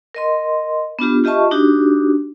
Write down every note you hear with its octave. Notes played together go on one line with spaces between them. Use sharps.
A#4 D#5 C6
B3 D4 F4 G4
F4 G4 D#5 E5 A5 C#6
D4 D#4 F#4 G4